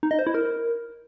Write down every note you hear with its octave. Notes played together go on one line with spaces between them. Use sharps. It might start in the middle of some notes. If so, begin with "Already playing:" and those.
D#4
D#5
C5
E4
A#4